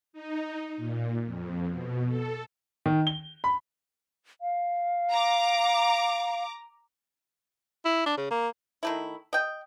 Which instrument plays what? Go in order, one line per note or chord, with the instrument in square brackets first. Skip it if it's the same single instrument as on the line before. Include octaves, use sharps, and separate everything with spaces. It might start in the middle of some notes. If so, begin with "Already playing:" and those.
[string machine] D#4
A#2
F2
B2
A4
[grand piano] D#3
G7
B5
[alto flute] F5
[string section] A#5 D6
[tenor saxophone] E4
D4
C#3
A#3
[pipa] D#3 A3 E4
D#5 G5